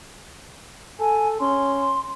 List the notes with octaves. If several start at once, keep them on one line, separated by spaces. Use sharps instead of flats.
A4 G#5
C#4 C6